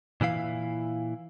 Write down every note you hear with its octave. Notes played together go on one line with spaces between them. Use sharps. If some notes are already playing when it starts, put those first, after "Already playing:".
A#2 E3 E4 F5